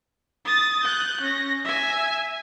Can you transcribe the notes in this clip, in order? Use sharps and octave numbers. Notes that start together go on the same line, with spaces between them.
D#6 A6
F#6 G6
C#4 A#6
E5 G#5